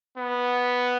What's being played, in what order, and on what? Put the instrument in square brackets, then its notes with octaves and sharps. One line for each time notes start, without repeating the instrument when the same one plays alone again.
[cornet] B3